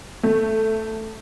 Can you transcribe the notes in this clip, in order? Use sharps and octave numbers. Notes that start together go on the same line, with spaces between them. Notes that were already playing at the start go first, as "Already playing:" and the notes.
A3